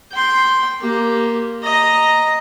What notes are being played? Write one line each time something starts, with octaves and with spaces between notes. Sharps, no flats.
G5 C6
A#3 G4
D#5 A#5